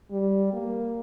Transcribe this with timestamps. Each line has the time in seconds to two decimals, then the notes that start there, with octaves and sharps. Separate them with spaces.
0.11 G3
0.53 A#3